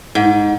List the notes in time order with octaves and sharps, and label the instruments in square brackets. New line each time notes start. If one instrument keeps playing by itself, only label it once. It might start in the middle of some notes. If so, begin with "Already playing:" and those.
[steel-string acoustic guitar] G#2